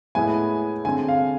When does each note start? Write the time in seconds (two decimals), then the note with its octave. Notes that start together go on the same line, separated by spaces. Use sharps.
0.15 A2 G#3 B3 E4 G#5
0.85 D3 G#3 C4 G#5
1.08 F5